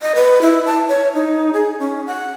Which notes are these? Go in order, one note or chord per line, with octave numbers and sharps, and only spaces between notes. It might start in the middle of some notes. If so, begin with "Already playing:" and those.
D#5
B4
E4
A5
C#5
D#4
G#4
C#4
F#5